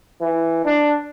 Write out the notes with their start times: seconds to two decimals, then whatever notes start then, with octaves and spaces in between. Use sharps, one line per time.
0.21 E3
0.65 D4